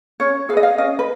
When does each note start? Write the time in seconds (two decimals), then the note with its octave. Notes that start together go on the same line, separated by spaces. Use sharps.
0.20 C#4 C#5
0.49 G#4 F5
0.53 B4 D#5
0.63 F5
0.78 C#4 D#5
0.99 B4